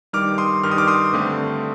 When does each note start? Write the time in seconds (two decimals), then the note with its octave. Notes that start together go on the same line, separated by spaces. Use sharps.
0.13 G2 D#3 G3 D6 F6
0.38 C6 D#6
0.63 G2 D#3 G3 F6
0.71 D#6
0.78 D6 F6
0.87 C6 D#6
1.13 G2 D3 A3 C4